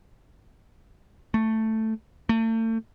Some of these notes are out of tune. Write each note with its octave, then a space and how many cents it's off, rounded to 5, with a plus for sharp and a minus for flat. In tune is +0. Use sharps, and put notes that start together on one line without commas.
A3 +5
A3 +40